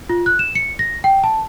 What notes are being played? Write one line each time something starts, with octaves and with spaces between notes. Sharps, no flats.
F4
F#6
E7
C#7
A#6
G5
A5